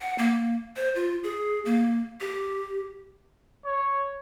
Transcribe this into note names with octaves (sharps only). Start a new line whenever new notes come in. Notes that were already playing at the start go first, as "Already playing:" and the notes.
F#5
A#3
C5
F4
G#4
A#3
G4
C#5